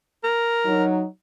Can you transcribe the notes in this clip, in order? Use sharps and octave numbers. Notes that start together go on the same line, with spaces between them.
A#4
F#3 D#4